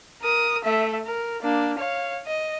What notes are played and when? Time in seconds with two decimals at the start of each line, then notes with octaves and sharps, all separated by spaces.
0.22 A#4 D#6
0.64 A3 E5
1.06 A#4
1.42 A#3 D4
1.78 C#5 F5
2.26 D#5